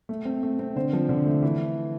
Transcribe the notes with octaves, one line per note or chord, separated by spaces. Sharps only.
A3
C4
A3
C4
D3 C5
F3
D3
A3
E3